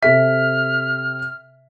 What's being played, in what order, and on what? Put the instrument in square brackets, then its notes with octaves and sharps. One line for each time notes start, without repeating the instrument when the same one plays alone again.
[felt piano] C3 A4 B6 [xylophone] E5 [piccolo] F6